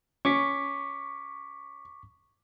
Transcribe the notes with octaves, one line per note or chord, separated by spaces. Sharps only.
C#4 C#6 D6 B6